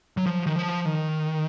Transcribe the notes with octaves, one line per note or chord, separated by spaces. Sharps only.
F#3
F3
D#3
F3
D#3